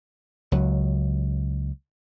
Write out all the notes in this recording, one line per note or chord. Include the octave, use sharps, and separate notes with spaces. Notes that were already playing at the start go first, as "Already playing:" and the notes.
C#2 F#3